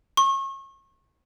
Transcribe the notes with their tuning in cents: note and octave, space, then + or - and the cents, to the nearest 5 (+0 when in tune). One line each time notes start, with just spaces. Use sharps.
C#6 -35